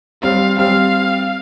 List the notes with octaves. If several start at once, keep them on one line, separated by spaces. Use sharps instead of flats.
G3 C4 F5
G3 C4 F5